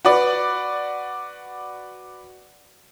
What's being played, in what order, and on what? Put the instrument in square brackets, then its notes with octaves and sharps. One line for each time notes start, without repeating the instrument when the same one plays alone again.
[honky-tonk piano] F#4 B4 D5